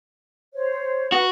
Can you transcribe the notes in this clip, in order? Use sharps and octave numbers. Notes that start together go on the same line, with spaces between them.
C5 C#5
F#4 B4